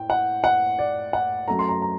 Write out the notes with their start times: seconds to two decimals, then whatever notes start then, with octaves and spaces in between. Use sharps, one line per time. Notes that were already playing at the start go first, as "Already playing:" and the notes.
Already playing: A2 G5
0.10 F#5
0.44 F#5
0.79 D5
1.13 F#5
1.48 F#2 F#3 A3 A#5
1.59 C6
1.69 A#5
1.82 A#5